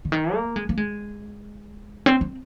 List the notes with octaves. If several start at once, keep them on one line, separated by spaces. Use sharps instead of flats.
D3
D#3
A#3
G#3
A#3
G#3
C4
C4